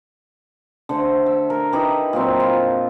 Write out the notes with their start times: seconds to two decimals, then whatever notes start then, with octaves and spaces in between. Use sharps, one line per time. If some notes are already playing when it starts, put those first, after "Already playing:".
0.89 D3 A3 C5
1.26 E5
1.50 A#4
1.73 D#4 E4 G4 B4
2.13 A#2 F#3 C4
2.40 F4